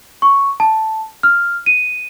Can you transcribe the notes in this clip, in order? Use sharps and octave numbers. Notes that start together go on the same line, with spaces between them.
C#6
A5
F6
D#7